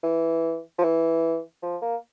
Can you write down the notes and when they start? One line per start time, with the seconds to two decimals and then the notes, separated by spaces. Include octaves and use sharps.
0.03 E3
0.78 F3
0.83 E3
1.63 F3
1.82 A#3